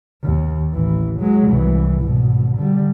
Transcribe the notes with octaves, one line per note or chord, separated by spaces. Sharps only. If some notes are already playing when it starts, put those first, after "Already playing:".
D#2
A1 E3
F#3 G#3
C2 E3
G#1 B2
D3 G3